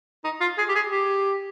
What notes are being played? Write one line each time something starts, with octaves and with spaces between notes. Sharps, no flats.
D#4
F4
G#4
G4
G#4
G4